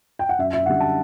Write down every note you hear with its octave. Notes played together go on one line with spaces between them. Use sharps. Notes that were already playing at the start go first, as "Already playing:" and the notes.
G5
F#5
F#2 E5
E5
D3 G3 F#5
A5